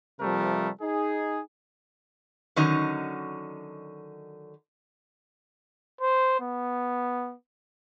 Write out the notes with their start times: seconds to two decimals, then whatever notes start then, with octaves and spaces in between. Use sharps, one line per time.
0.20 C3 F3 G3 A3 A#4
0.82 D#4 G#4
2.56 D3 D#3 F#3 C#4 D#4 D#5
6.01 C5
6.40 B3